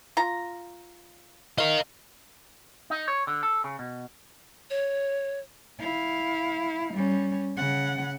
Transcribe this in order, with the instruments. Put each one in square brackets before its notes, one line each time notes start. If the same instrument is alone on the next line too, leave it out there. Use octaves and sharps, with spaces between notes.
[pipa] F4 A#5
[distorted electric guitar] A#4 D#5 [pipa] F5
[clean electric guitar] D#4
C#5
D3
A4
C#3
B2
[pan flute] C#5
[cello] E4 F5
G3 C#4
C#3 F#5